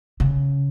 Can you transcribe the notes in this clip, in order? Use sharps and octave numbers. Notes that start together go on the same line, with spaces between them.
C#3